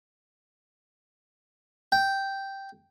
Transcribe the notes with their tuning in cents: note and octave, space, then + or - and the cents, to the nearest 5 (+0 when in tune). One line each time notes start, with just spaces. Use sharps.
G5 -5